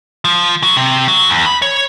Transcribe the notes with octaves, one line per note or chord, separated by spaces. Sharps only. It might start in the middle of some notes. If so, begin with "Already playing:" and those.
F3
F#3
C3
F#3
E2
B5
C#5